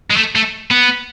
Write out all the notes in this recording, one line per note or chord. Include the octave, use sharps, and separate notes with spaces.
G#3
A3
A3
B3